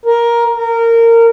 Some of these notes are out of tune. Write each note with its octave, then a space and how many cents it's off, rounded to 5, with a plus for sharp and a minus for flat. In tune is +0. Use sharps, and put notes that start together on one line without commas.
A#4 +10
A#4 -20